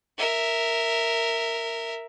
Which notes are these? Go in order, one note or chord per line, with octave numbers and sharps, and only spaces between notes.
A#4 E5